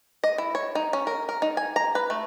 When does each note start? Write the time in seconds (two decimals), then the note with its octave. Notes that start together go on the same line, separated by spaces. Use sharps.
0.24 D#5
0.38 E4
0.55 C#5
0.75 D#4
0.93 C#4
1.07 A#4
1.29 A#4
1.42 D#4
1.57 G#5
1.76 A#5
1.95 B4
2.10 A3